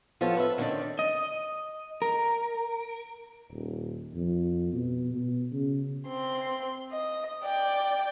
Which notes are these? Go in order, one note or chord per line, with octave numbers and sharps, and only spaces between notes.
F3 B3 F4 A4 C#5
B4 E5
D3 D#3 C4 C#4 D5
D#5
A#4
D#1
F2
B2
B2
C#3
C4 C6
D#5
D5 G5